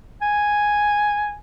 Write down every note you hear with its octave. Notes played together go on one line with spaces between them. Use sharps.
G#5